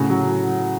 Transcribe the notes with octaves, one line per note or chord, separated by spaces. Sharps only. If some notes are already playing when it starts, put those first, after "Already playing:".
Already playing: A2 C#3 F#4
F#3